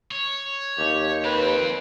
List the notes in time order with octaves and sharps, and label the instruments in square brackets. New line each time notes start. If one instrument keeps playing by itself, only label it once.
[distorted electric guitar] C#5
[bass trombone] D#2 [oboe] G4
[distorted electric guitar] F2 C4 [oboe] B4